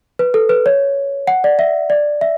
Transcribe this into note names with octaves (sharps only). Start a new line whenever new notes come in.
B4
A4
B4
C#5
F#5
D5
E5
D5
E5